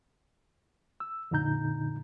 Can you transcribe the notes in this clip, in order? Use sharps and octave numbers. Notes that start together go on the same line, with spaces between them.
E6
F2 A#2 D3 D#4 A#5 G6